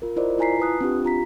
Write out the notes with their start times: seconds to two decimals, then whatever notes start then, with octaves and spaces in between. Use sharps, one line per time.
0.02 F4 A#4
0.16 E4 F4 A#4 C5 D5 D#5
0.38 E4 F4 G#5 A#5 B6 C7
0.59 B4 A5 D#6 F#6
0.81 C4 D4 F4 G4
1.05 F4 A#5 B6